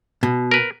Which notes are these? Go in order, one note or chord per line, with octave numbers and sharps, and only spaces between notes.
B2
A#4 B4